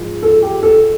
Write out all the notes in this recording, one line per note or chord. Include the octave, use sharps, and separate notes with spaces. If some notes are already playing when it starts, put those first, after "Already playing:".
Already playing: G#2 F3 G#3
A4
G4
A4